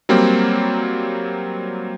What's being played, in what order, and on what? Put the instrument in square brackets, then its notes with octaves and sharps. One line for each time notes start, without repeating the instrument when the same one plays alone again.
[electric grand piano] F#3 G3 A#3 C4